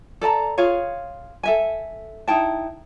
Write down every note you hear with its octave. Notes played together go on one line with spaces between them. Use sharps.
A4 D5 A5 A#5
F4 G#4 C#5 F5
A4 E5 G#5
D#4 E4 G5 A5